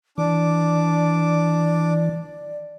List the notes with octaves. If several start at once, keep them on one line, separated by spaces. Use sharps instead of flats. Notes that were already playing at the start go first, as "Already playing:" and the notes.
E3 D4 D5 D6